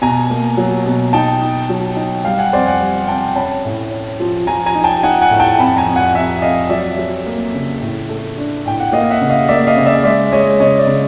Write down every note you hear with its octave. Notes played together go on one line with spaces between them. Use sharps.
B2 G#5 A#5
A#3
F#3
B2
D#4 G5 A5
D#4
F#3
D#4
G3 F5 G5
F#5 G#5
F2 C5 D5
F#5 G#5
G3
C3 G5 A5
C#4 A5 B5
A2
C#4
F3
F3 G#5 A#5
G#5 A#5
D#4
G5 A5
D#4 F#5 G#5
F#5 G#5
A2
G5 A5
F2 A5 B5
G#5 A#5
F2
F#5 G#5
F2 E5 F#5
F2 D#5 F5
F#3 D5 E5
F#3
A#3
C#3
A2
A3
D4
A2 G5
F#5
A#3 D#5 F5
E5 F#5
C#3
D#5 F5
A#3 D5 E5
D#5 F5
C#3
D5 E5
G#3 D5 E5
G#3 C#5 D#5
C#3 C#5 D#5
D5 E5
C#3